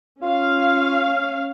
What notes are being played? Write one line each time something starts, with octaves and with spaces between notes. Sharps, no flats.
C#4 F4 F5